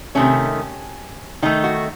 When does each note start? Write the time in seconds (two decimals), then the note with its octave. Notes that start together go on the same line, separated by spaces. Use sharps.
0.15 C3 D#3 A3 C#4
1.42 D#3 A3 D#4
1.64 F#4